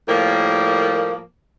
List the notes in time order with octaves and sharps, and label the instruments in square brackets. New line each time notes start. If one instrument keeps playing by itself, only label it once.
[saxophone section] A2 F3 G3 A#3